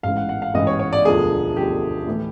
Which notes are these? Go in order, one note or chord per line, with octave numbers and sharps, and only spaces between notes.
A1 G#2 E3 F5
F#5
F#5
F5
A1 G#2 E3 D#5
C#5
C#5
D5
E1 D2 D3 F3 G#4
E1 D2 D3 F3 G4
A2 E3